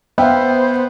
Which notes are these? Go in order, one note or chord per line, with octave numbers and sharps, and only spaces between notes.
B3 C5 E5 F5 G5